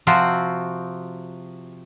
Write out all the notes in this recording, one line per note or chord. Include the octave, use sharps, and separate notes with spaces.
C3 F3 C4 F#4